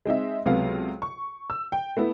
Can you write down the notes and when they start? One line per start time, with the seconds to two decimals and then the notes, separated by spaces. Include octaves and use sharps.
0.05 G#3 C4 D#4 E5
0.46 C#2 C3 F#3 B3 A4 F5
1.02 C#6
1.50 E6
1.72 G5
1.97 A3 B3 E4